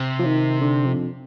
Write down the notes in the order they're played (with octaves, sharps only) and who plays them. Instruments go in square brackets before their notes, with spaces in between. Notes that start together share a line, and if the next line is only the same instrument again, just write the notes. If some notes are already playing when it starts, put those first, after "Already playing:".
Already playing: [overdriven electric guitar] C3
[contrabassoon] F3
D#3
D3
F2